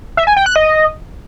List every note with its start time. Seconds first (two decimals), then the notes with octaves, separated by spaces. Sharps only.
0.17 E5
0.27 G#5
0.37 G5
0.46 F#6
0.56 D#5